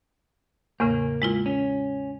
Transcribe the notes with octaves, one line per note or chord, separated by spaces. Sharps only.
E2 A2 C#3 A#3
G#3 E4 F4
C#4